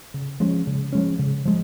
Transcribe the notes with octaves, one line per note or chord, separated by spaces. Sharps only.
C#3
F3 G#3 C#4
C#3
F3 G#3 C#4
C#3
F3 G#3